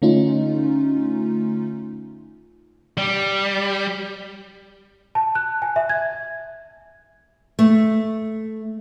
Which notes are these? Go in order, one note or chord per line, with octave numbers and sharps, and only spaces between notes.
D3 A3 C#4 D#4 F4
G3
A5
F#6
G#5
E5
G#6
A3